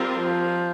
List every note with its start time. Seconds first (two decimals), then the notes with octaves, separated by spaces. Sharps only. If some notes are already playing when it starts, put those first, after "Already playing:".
Already playing: G3 C4 F4 A#4
0.18 F3